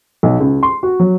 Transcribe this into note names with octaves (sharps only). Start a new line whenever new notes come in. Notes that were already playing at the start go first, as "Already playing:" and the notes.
B1
C#2
C6
F#4
F#3